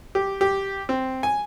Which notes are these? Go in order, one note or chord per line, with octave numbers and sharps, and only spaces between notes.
G4
G4
C4
G#5